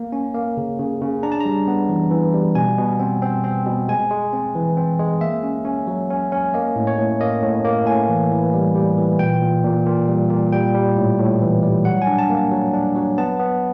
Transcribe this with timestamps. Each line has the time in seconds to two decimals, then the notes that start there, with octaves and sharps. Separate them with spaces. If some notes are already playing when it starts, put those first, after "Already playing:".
Already playing: A#3
0.12 C#4
0.34 A#3
0.57 C#3
0.79 C#3
1.01 C#3
1.23 D4 A#5
1.32 A5
1.40 G3 A#5
1.67 B3
1.89 E3
2.11 E3
2.34 G3
2.55 B2 G#5
2.78 B2
2.99 C4
3.22 C4
3.44 C4
3.67 B2
3.88 G#3 G#5
4.11 G#3
4.33 C4
4.55 E3
4.77 C4
4.99 G#3
5.21 A#3 E5
5.43 C#4
5.65 C#4
5.87 F#3
6.10 C#4
6.32 C#4
6.54 A#3 D#5
6.76 A2
6.87 C#5
6.98 A2
7.20 A#3 D#5
7.42 A2
7.65 A#3
7.86 A2 G#5
8.09 E3
8.31 E3
8.54 G3
8.75 G3
8.97 E3
9.19 A#2 G5
9.42 A#2
9.64 A#2
9.86 A#2
10.08 G3
10.30 A#2
10.52 G3 G5
10.75 G3
10.96 A2
11.19 A2
11.41 E3
11.63 G3
11.85 F#3 F#5
12.02 G#5
12.07 D4
12.18 A5
12.30 A#3
12.51 F#3
12.74 D4
12.95 F#3
13.18 B3 A5
13.39 B3